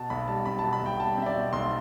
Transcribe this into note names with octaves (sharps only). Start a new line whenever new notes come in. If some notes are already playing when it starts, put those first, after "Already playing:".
Already playing: B2 A5
B1 B5
G3 A5
C4 B5
A5
B2
B5
B1 G5
G3 A5
C4 E5
D5
B2
B1 C6